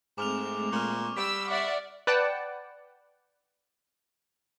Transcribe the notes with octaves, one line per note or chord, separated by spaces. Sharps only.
G#2 G#3 A3 C4 D6 F6 F7
A#2 C#6 F6
G3 B5 E6 B6
D5 E5 F#5 D6
B4 D5 F#5 G5 A5